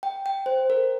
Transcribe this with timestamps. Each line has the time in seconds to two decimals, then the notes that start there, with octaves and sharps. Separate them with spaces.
0.03 G5
0.26 G5
0.46 C5
0.70 A#4